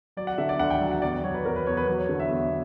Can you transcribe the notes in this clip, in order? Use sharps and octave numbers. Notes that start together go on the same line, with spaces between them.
F#3 D5
F#5
D3 E5
D5
D2 F#5
G5
F#3
F#5
E2 D5
D5
F#3 C#5
B4
E2 A#4
B4
E2 C#5
B4
F#3 B4
C#5
D3
E5
E2